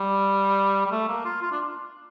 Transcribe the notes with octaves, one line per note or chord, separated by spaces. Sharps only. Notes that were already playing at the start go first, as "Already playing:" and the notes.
Already playing: G3
G3
A3
A#3
F4
F4
D4